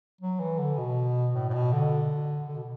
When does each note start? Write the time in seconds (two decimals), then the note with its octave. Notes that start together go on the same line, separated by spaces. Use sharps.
0.21 F#3
0.40 E3
0.59 D3
0.78 B2
1.34 A2
1.49 A2
1.54 B2
1.72 D3
2.48 D3
2.55 B2